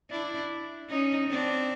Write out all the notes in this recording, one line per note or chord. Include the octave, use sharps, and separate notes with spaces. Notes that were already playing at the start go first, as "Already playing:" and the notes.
D4 E4
C#4 D#4
C4 D4